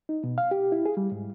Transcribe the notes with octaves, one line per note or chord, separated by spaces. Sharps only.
D#4
B2
F5
G4
E4
G#4
G3
G#2